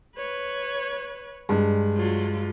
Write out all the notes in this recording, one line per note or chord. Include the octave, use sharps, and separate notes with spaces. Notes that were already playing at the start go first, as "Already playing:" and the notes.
B4 C#5
G2 G#3
F#3 F4